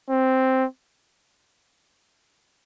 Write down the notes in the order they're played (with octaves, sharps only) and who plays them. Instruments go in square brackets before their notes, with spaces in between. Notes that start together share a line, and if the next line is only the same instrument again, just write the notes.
[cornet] C4